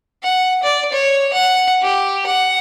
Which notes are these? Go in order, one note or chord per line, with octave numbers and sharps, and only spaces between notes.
F#5
D5
C#5
F#5
G4
F#5